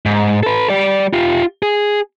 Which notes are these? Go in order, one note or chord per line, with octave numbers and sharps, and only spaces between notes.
G#2
A4 B4
G3 D5
F4 G4
G#4